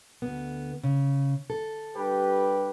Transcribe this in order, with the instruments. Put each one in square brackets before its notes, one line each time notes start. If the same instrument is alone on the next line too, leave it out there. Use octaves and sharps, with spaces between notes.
[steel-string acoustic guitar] D2 B3
C#3
A4
[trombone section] G2 G4 B4